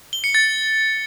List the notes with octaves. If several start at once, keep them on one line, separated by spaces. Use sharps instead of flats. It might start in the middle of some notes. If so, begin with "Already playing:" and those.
G7
C#7
A6